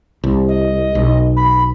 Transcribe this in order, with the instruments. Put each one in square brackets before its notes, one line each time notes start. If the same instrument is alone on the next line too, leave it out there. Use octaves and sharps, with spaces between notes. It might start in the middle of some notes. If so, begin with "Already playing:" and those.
[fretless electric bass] C2
[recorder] D#5
[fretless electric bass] B1
[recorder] B5